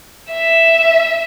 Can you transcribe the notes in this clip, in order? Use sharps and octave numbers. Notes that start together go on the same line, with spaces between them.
E5